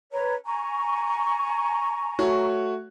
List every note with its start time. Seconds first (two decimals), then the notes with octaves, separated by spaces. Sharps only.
0.12 B4 C#5 A#5
0.45 G#5 A#5 C#6
2.19 A3 F#4 C#5